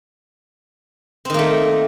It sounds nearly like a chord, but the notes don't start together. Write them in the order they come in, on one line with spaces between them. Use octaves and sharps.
C4 D#3 A#3 A3